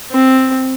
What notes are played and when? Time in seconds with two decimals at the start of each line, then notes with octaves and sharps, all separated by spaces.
0.11 C4